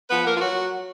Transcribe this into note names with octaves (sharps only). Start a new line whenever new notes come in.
F3 B3 B4
A#3 A#4
F4
F#3 F#4